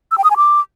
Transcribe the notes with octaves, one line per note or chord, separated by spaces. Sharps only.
E6
G5
D#6
G#5
D6